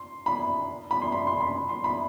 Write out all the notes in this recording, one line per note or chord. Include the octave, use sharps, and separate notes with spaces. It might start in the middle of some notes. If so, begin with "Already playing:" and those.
Already playing: C6
B5
B5
C6
B5
C6
B5
C6
B5